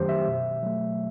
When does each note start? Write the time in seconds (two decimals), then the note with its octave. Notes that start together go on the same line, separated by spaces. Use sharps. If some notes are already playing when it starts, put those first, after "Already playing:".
Already playing: F#2 D#3 F#3 A3 G4 C5
0.09 E5
0.27 B2
0.62 F#3 A3